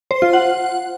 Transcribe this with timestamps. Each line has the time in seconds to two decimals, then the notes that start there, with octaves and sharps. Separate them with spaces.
0.11 C5
0.22 F4
0.33 F#5